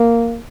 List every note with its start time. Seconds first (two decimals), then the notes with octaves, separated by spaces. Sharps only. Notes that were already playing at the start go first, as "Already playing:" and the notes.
Already playing: A#3